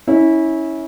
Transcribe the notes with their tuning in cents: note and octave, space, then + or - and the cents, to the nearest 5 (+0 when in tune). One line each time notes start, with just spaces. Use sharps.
C#4 +0 E4 -25